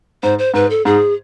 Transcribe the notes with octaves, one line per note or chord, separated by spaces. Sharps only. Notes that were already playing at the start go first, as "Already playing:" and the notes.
G#2 C5
C5
G#2 B4
A4
G#2 G#4